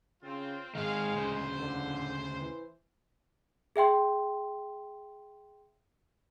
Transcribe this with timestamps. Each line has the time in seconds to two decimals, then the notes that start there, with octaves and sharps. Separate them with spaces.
0.23 C#3 C4 F4
0.75 G#2 D#3 G#3 F5
1.17 D2 C#3 C5
1.60 D3
2.38 E3
3.76 G#4 E5 G5 C6